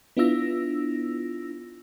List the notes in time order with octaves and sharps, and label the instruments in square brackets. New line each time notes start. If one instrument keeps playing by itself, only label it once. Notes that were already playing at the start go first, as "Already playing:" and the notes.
[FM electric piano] B3 D4 E4 F4 E6 A#6